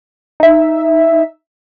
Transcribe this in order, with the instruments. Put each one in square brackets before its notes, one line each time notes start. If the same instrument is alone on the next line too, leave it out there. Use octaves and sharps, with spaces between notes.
[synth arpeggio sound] D#4 E5